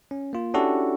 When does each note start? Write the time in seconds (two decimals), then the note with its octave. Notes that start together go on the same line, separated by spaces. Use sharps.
0.11 C#4
0.33 A#3 F4
0.54 C#4 D4 E4 F#4 G4 A4